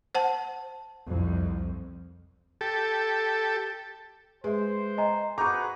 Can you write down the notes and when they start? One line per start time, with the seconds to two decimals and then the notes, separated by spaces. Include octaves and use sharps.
0.15 C5 F#5 A5
1.07 C2 F2
2.61 G4 A4
4.44 G#3 B4 C5 E5
4.98 D#5 G#5 A#5
5.38 F#4 G#4 B4 A#5 C#6 D6 G6